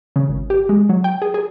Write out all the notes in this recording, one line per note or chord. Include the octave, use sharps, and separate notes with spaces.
C#3
G#1
G4
G#3
F#3
G5
G#4
G#4